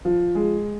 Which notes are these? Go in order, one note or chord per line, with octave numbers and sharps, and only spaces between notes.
F3
G#3